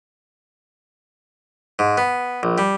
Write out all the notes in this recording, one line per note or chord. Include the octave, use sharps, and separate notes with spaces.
G#2
B3
A#1
G3